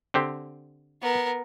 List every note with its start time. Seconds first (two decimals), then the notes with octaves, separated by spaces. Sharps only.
0.14 D3 C4 G4
1.02 B3 A#4